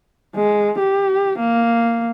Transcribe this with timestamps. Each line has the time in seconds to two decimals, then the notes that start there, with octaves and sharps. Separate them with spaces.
0.36 G#3
0.79 G4
1.39 A#3